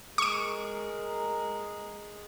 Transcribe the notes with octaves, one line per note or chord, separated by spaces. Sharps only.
G#3 A#4 C#6 D7